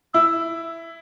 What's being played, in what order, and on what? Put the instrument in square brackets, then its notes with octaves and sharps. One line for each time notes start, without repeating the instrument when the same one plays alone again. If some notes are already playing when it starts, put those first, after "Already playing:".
[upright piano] E4 [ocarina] E6